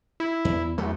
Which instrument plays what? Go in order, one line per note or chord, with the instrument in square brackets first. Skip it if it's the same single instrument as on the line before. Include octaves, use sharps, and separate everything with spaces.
[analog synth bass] E4
[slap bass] E2
[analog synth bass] E2 [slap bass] F#3 A3